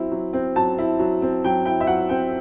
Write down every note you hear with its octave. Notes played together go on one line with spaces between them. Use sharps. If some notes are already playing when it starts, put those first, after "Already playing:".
Already playing: F#3 C4 E4
F#3
C4
F#3 A5
E4
F#3
C4
F#3 G5
E4 G5
E5
F#3 F#5
C4 G5